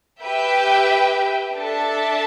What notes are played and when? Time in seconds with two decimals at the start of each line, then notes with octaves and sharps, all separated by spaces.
0.21 G4 B4 E5 G5
1.55 D4 A4 E5 A5